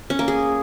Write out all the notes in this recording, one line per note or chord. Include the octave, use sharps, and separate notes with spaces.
C#4
A#3
G#4